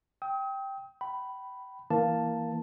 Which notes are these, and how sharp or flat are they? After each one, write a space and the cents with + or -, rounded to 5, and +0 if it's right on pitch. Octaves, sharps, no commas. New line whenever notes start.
G5 +0 D#6 +40
G5 -35 B5 +0
E3 -5 A#3 +0 A5 +5